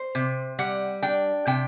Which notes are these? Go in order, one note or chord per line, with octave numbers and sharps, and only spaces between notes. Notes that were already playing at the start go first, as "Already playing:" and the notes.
Already playing: C5
C3
G3 F#5
D4 G5
C3 G5